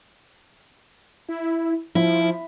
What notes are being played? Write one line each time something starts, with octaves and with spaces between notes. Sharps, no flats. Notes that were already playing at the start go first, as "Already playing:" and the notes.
E4
F3 E4